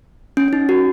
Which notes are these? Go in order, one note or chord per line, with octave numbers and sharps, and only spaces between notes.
C#4
C#4
D#4
F#4